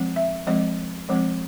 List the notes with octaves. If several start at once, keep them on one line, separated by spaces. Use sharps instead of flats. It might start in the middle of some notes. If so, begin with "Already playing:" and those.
Already playing: F3 G#3 C4
E5
F3 G#3 C4 D#5
F3 G#3 C4